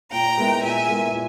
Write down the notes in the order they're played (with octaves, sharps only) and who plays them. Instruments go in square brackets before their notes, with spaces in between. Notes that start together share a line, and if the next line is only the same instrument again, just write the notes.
[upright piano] A#2 [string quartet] G5 A#5
[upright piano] G#3 B3 E4 A#4
[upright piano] A#2 [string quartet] E5 G#5
[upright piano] G#3 B3 E4 A#4
A#2